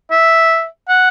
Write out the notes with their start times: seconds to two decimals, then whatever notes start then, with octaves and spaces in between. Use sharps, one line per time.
0.11 E5
0.89 F#5